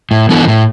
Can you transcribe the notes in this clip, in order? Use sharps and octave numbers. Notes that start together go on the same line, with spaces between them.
A2
E3 B3 D4 A4
A2